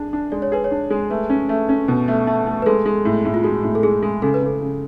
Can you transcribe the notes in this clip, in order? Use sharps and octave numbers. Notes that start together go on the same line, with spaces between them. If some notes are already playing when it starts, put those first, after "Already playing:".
Already playing: D4 G#4
D4
G#3 D5
C#5
G#4 B4
C#5
D4
G#3
A3 B4
C#4
A3
C#4
B2
A3
A3
A3
B4
G#3 A4
G#3
A2
A2
F4
G#3 F#4
A2
A4
G#3 G#4
G#3
C#3 A4
B4
C#3 A4
C#3